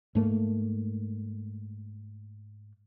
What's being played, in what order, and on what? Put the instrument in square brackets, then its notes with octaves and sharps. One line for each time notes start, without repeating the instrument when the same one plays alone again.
[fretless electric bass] G#2 A3 A#3